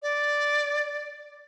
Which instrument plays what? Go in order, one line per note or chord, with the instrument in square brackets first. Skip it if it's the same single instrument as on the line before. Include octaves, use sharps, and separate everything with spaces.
[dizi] D5